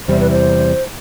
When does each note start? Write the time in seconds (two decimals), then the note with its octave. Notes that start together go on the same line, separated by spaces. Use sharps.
0.08 E2 C3 G3 C5
0.20 B4
0.31 C5